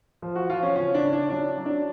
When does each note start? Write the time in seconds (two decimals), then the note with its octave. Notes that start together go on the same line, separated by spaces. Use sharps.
0.22 F3
0.36 F#4
0.50 F3 F4
0.63 C#4
0.76 C#3 C#4
0.94 D4
1.03 C#3
1.13 D4
1.30 F#3 D4
1.57 F#3
1.66 D4